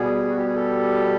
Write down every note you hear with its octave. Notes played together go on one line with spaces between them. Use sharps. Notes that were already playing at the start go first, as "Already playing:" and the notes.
Already playing: B2 G3 B3 G#4
F#4
G4
G#4
G4 A4